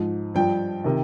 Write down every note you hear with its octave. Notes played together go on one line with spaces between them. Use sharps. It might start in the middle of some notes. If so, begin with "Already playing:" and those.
Already playing: G#2 F3
G2 F3 G5
C3 D#3